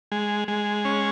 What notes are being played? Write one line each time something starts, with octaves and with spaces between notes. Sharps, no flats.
G#3
G#3
C#4